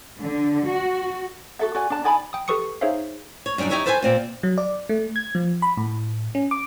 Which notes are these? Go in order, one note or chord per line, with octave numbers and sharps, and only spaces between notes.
D3
F#4
F#4 A4 E5
F#4 D5 G#5
D4 A5
D#4 D5 G#5 B5
G5 D#6
G4 A4 B4 C#6 D#6 C#7
D#4 G#4 C5 C#5 E5 F5
C#5
F#2 G3 C4 D4 D#4
D#4 E4 G4 C#5 D#5 E5
A4 B4 C5 E5 F#5 G#5
A#2 C4 F4
F#3
D5
A3
G#6
F3
B5
A2
C#4
D6